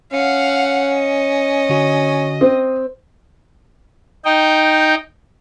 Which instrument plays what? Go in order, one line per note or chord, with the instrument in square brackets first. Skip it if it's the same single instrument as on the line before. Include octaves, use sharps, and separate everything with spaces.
[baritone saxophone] C#4 [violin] F5 F#5
[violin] D#5
[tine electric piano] D3 F#4
[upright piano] C4 [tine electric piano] D#6
[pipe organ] D#4 D#5 G5